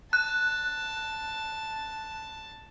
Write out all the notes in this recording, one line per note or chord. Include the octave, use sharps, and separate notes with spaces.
A5 F#6